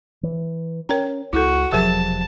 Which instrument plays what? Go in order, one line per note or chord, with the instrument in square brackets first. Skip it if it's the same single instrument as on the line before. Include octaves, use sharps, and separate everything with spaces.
[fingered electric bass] E3
[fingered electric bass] C#4 [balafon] A#4 G5 A#5
[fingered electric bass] C#2 [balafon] E4 A4 [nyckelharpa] F#4
[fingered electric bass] E1 C3 F3 [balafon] F#3 G#4 A#4 [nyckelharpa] A5